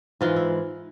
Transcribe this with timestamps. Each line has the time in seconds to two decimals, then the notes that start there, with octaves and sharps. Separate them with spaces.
0.21 G#2 E3 G#3 F4
0.36 E4